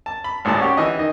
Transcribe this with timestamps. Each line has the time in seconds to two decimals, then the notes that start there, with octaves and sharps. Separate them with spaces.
0.06 A5
0.24 B5
0.45 G#1 D2 A2 A5
0.60 C#4 F#4 G4
0.77 E3 D#5
0.98 D#3 D#5